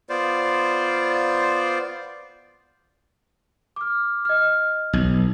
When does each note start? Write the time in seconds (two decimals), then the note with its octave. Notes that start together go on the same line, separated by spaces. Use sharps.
0.09 B3 F4 C5 D5
3.76 D6 F6
4.25 D#5 F6
4.93 B1